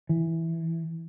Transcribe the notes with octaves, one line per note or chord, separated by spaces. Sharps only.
E3